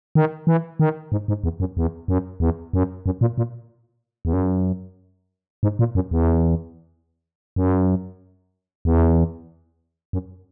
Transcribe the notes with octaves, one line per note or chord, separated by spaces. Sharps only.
D#3
E3
D#3
G#2
G#2
E2
F#2
E2
F#2
E2
F#2
F#2
A#2
A#2
E2
F#2
G#2
A#2
F#2
E2
F#2
E2
F#2